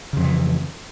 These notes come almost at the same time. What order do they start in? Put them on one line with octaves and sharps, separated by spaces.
C#3 F2 F#3 E3